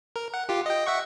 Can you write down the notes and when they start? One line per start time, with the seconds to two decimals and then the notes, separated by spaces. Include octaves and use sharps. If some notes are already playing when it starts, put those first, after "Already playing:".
0.16 A#4
0.34 F#5
0.49 F4 G4
0.66 D#5 G5
0.86 E5 F#5 C#6